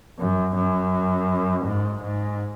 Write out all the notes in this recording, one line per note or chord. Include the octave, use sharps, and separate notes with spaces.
F#2
F#2
G#2
G#2